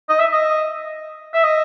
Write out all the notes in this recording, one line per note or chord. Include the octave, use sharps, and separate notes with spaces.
D#5
E5
D#5
E5
D#5